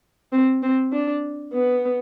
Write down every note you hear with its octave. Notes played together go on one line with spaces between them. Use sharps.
C4
C4
D4
B3